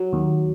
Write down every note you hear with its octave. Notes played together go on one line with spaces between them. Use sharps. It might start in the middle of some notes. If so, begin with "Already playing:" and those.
Already playing: F#3
D#2